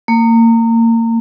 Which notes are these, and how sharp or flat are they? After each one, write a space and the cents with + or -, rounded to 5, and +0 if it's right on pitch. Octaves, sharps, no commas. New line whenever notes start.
A#3 -30